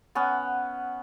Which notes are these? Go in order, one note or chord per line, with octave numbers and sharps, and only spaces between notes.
B3 C#4 F#5